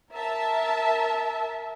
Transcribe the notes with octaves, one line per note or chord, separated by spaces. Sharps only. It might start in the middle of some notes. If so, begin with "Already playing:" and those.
A#4 E5 A5